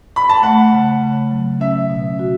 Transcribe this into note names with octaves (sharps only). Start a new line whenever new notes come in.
B5
A5
A3 F#5
C#3
C#3
F#3
C#4 E5
B2
F#4